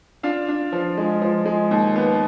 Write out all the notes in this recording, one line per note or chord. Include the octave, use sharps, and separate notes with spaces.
D4 F4 F5
D4
F3
G#3
F3
G#3
D#2
B3